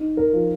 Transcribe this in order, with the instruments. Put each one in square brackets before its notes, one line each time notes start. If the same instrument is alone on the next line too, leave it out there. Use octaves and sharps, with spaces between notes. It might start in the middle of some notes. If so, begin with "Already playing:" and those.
Already playing: [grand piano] D#4
[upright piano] A#4
[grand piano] F3